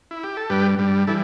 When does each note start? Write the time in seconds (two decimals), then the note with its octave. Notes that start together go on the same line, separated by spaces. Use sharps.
0.11 E4
0.24 G4
0.37 A4
0.50 G2 G3 G4 B4
0.79 G2 G3
1.07 E3 G3 E4 A4